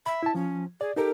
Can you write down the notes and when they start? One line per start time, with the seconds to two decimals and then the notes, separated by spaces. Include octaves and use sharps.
0.06 E5 B5
0.23 E4 A5
0.35 F3 C#4
0.81 G#4 D5
0.96 D#4 G4 A4 A#4